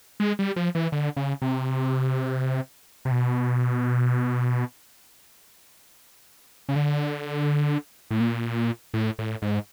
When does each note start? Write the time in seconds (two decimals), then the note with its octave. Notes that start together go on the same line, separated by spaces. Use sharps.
0.20 G#3
0.39 G3
0.56 F3
0.75 E3
0.92 D3
1.17 C#3
1.42 C3
3.05 C3
3.11 B2
6.69 C#3
6.76 D3
8.11 A2
8.20 A#2
8.94 A2
9.19 A2
9.42 G#2